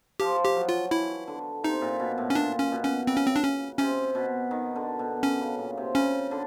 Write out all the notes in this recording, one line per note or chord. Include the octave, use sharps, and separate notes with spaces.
F3 G4
G4
F#3
F4
E3 E4
D3
C3 D#4
A#2
B2
A2
C#4
A#2 D4
C#4
B2
C#4
C#3 C4
C#4
C4
D4
C#4
C3 C#4
B2
D#3
D3
B2
D3 C#4
C#3
A#2
C3
C#3 C#4
D3